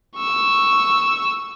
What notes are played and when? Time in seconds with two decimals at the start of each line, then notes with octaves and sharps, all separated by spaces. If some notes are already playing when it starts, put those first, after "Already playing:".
0.17 C#6 E6